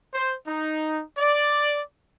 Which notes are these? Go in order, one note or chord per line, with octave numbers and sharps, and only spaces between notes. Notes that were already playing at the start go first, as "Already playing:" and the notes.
C5
D#4
D5